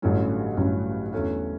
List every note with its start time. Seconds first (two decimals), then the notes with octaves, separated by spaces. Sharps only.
0.02 A1 G2 D3 F#3 C#4
0.57 A1 G2 D3 F#3 C#4
1.12 E2 D3 A3 C#4 F#4